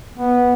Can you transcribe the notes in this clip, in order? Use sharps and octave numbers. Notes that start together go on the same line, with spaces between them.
B3